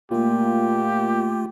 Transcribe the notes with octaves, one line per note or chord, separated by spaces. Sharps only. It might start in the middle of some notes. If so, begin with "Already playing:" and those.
A#2 A3 A#3 F4 G4